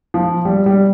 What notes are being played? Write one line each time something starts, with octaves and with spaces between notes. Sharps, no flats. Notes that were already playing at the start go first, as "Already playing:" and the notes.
F3
G3
G3